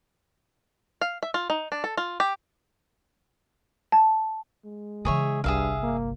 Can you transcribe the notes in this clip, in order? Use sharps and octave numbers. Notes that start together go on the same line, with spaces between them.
F5
E5
F4
D#4
D4
A4
F4
G4
A5
G#3
C#3 E3 G#4 C#5 E5
G1 C2 G2 G#4 E5 F5
A#3